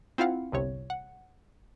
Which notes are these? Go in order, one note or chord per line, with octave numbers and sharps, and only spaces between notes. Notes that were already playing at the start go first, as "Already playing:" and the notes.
C4 E4 F4 F5 F#5
G1 C2 C3 C#5
F#5